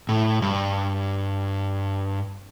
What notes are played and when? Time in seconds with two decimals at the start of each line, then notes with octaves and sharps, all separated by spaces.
0.09 A2
0.42 G2